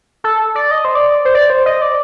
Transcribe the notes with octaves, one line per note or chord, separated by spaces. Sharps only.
A4
D5
D#5
C5
D5
C5
D5
C5
D#5
D5